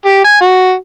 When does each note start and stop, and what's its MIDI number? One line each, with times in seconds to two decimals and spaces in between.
0.05 0.22 67
0.24 0.41 80
0.41 0.73 66